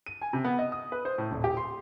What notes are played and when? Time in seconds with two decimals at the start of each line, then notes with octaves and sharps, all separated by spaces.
0.06 D#7
0.22 G#5
0.33 C3
0.45 B3
0.59 D#5
0.72 D#6
0.92 B4
1.05 C5
1.18 A2
1.31 D#1
1.44 G4
1.57 C6